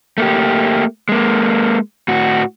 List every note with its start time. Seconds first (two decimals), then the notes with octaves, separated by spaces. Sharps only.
0.18 A3 A#3 G4
1.09 G#3 A#3
2.08 A2 F#4